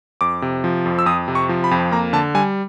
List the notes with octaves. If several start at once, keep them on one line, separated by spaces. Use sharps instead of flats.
F2 D6
C3
F3
F2
E6
F2 D#6
C3
C#6
F3
B5
F2
A#3 A#5
D3 A5
G3 G#5